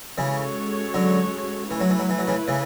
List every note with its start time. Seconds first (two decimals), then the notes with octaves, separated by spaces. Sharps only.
0.17 C#3 E3 G#3 C#4 F#4 A4 C#5
0.94 D3 F#3
1.71 E3 A3 E4 B4
1.81 F#3
1.90 E3
1.99 F#3
2.10 E3
2.18 F#3
2.28 C#3 E3
2.48 C#3 E3